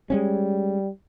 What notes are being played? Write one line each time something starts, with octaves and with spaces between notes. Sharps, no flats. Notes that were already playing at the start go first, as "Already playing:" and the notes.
G3 G#3 B3 C#4